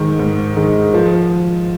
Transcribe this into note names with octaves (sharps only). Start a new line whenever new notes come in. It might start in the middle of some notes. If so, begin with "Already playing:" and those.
Already playing: G#2 D#3 G#3
G#2
D#3 G#3
F3